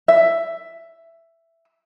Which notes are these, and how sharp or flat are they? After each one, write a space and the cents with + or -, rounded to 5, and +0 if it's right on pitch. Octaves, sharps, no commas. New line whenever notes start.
E5 +10